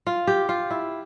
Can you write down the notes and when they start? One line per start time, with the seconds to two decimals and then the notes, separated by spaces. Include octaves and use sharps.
0.07 F4
0.27 G4
0.49 F4
0.70 E4